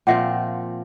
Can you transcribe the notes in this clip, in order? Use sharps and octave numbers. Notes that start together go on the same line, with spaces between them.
A#2 F3 C4 E5 F#5 G5